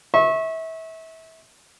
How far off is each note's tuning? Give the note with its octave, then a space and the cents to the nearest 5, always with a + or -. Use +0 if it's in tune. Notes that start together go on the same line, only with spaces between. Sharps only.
E5 -30 C#6 -25